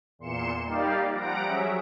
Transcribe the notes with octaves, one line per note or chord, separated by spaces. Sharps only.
E2 A#2 C6 C#7 E7
G3 A#3 D#4 G4 D5 F5
F3 G3 F#5 A#5 A#6 D7
F#3 C#4 G#4 E5